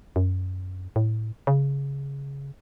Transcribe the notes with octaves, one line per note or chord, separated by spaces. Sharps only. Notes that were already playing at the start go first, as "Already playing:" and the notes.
F#2
A2
C#3